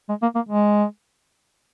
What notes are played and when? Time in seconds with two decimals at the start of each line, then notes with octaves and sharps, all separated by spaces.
0.09 G#3
0.22 A#3
0.35 A#3
0.49 G#3